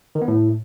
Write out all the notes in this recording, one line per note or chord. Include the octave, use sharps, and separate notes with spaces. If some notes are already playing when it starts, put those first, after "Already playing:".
D#3
B3
A2